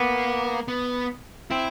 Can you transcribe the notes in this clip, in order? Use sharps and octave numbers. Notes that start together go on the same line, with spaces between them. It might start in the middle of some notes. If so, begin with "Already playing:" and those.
Already playing: A#3 B3
B3
C4 E4